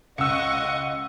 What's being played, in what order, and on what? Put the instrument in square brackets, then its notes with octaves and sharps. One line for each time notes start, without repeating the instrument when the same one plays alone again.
[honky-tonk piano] C#2 [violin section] D#5 C#6 [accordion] F#5 [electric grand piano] E6 C#7